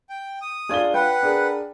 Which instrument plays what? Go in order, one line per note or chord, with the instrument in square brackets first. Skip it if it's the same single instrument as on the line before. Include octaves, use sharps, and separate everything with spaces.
[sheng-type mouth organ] G5
D#6
[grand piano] D4 F4 G7 [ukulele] G#4 D5
[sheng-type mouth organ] B4 F#5 [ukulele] G5
[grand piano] D4 G#4 A#4